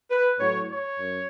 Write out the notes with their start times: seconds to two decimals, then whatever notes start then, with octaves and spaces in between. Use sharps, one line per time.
0.11 B4
0.40 A2 F#3 C#5
0.70 C#5
0.99 F#2